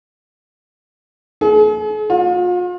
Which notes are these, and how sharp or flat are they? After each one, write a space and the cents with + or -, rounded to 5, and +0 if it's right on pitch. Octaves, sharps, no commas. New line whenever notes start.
G#4 +45
F4 +40